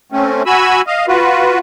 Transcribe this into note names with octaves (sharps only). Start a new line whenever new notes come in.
A3 C4 C#4
F#4 G#5 B5 E6
D#5 F5
F4 F#4 B4